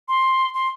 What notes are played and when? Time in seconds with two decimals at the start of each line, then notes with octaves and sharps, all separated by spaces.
0.08 C6
0.54 C6